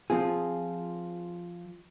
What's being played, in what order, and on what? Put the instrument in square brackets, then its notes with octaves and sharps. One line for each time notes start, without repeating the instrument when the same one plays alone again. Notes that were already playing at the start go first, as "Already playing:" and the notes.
[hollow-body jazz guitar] F3 C4 F4 G#4